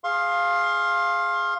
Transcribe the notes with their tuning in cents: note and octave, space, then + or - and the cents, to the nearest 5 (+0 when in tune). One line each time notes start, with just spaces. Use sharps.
G#4 +0 F5 +0 C6 +35